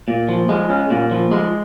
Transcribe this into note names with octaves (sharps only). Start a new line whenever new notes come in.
A#2
F3
G#3
C#4
A#2
F3
G#3